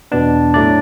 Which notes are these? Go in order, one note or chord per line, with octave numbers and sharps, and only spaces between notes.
E2 B2 B3 D4 A5
A2 F#3 A3 D4 D5